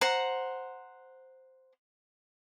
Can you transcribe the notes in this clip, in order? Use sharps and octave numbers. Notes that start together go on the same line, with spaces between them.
C5 F#5 A#5